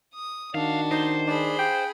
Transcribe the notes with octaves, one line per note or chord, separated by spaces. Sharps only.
D#6
D#3 D4 F#4 F5
D#4 C5
D4 G#4 B5
G5